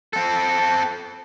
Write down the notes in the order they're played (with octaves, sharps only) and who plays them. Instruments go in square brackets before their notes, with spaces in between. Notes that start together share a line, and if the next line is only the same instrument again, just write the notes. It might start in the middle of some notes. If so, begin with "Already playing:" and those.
[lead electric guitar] C4 A4